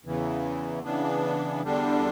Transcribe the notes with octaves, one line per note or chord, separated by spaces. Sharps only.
E2 C#3 E3
C#3 E3 B3 D4
E2 D3 G3 D4